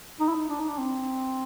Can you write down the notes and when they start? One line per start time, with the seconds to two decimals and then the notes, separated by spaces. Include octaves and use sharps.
0.20 D#4
0.28 E4
0.35 D#4
0.49 D4
0.59 D#4
0.68 D4
0.78 C4